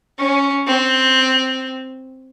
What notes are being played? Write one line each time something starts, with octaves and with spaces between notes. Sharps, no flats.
C#4
C4